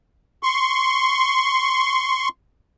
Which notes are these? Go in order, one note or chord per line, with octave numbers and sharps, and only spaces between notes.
C6 C#6